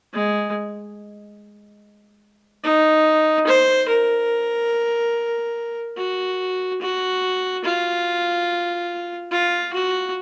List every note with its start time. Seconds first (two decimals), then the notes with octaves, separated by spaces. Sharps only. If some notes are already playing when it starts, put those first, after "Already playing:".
0.13 G#3
2.63 D#4
3.47 C5
3.88 A#4
5.97 F#4
6.81 F#4
7.64 F4
9.31 F4
9.73 F#4